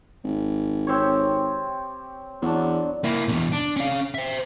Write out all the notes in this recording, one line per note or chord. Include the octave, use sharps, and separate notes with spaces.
G#1
C4 G4 C#5
E2 F#3 D4
A#3 E4
E2 B2
D4
C#4 F5
C5 E5